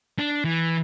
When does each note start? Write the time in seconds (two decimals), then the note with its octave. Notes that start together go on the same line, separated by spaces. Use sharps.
0.19 D4
0.45 E3